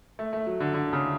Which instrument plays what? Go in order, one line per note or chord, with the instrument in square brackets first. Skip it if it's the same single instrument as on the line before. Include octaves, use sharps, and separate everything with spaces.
[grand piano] A3
A3
F#3
D3
D3
C#3